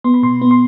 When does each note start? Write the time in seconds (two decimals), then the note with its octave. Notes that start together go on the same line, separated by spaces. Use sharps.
0.04 B3 C6
0.14 B5
0.23 B2 C6
0.42 B3
0.51 C6